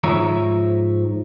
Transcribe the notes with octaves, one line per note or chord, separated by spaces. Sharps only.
G#2 F3 C#5 E5 A#5